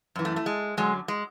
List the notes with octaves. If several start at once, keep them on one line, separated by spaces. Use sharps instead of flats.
F#2 E3
A3
A3
G#3
F#2 D3 F#3 G#3
G#3